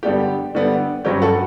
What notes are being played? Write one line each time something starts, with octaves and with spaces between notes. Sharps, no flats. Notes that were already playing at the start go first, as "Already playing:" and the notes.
D3 G3 B3 D4 G4
D3 G3 B3 D4
G2 F#3 C#4 G4
F#4 A4